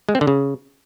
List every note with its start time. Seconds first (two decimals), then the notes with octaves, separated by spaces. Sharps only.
0.09 G#3
0.15 C4
0.21 D3
0.27 C#3